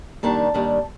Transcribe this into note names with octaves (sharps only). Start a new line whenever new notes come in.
D#2 D#3 G3 D4 A5
D#2 D#3 G3 D4